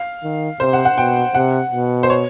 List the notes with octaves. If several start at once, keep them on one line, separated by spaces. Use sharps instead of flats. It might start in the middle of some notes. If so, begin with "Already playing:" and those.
Already playing: F5
D#3
C3 C5
F#5
F#5
B2 G5
C3 F#5
B2
C5
C#5